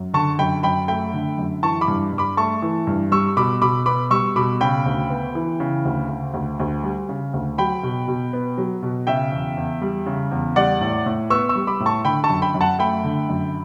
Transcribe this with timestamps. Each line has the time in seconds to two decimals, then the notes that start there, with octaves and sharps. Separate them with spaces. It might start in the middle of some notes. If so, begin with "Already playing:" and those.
Already playing: F#2
0.14 D3 A5 C#6
0.39 F#2 G5 B5
0.63 F#2 G5 B5
0.88 A3 G5 B5
1.13 D3
1.38 F#2
1.63 E3 A5 C#6
1.81 B5 D6
1.88 G2
2.13 G2
2.18 B5 D6
2.37 A3 A5 C#6
2.62 E3
2.87 G2
3.11 G3 C#6 E6
3.36 B2 B5 D6
3.62 B2 B5 D6
3.86 B3 B5 D6
4.11 G3 C#6 E6
4.36 B2 B5 D6
4.60 C#3 G5 B5
4.86 D2
5.10 B3
5.35 E3
5.60 C#3
5.85 D2
6.10 C#3
6.34 D2
6.59 D2
6.84 G3
7.09 C#3
7.33 D2
7.58 F#3 G5 B5
7.83 B2
8.08 B2
8.33 B3
8.58 F#3
8.82 B2
9.07 C#3 E5 G5
9.32 E2
9.57 E2
9.81 G3
10.06 C#3
10.31 E2
10.56 G3 D5 F#5
10.81 A2
11.06 A2
11.30 B3 C#6 E6
11.49 C#6 E6
11.55 G3
11.67 B5 D6
11.80 A2
11.86 A5 C#6
12.05 D3 G5 B5
12.24 A5 C#6
12.30 F#2
12.42 G5 B5
12.54 F#2
12.61 F#5 A5
12.79 A3 G5 B5
13.04 D3
13.29 F#2